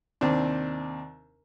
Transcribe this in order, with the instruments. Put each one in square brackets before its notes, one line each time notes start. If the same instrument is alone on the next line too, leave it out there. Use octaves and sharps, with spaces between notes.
[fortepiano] D#2 C3 C4 D4